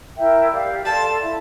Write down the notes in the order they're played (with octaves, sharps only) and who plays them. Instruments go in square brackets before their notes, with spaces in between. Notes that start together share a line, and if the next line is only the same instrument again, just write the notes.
[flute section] E4 A#4 E5 G5
G4 D5 F5
[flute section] A4 D5 F5 C6 [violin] A5
[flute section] E4 A4 E5 A5